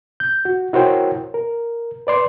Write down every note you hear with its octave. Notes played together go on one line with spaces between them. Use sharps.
G6
F#4
E4 F#4 A#4 C5 C#5 G5
A#4
B4 D5 C6